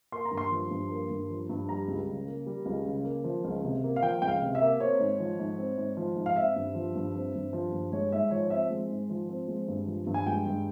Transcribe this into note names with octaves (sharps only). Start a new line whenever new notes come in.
A#3 C6
A#5
G2
C6
F3
G2
A#3
G2
F3
G2
G3 A#5
C#2
C#3
A#3
G3
C#2
C#3
A#3
F3
C#2
C3
A#3
F5
F3 G5
C#2 G5
F5
C3
E5
A#3
C4 C#5
G#2
F3
G#2
C4
G#2
F3
G#2
F5
C4 E5
G2
F3
G2
C4
G2
F3
G2
G#3 C#5
G#2 E5
F3 C#5
C4 E5
G#3
G#2
F3
C4
G#3
G2
F3
G2
G#5
G#3 G5
G2